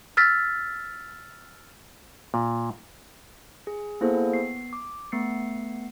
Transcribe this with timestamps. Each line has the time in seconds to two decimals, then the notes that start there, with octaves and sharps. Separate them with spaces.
0.17 E6 F6 A6 B6
2.34 A#2
3.67 G#4
4.01 A#3 B3 E4 G#4 A4 C5
4.33 B3 C7
4.73 D6
5.12 A3 B3 C7 C#7